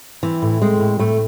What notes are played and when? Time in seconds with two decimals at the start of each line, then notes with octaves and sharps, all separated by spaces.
0.23 E3 C4
0.42 A2
0.61 G#3 C4
0.80 A2
0.99 A2 A3